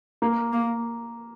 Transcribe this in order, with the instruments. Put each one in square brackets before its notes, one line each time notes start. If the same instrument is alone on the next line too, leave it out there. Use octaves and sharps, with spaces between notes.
[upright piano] A#3
[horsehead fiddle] A#3